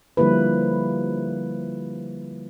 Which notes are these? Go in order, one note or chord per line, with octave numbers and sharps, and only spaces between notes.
D3 F3 G3 A#3 E4 B4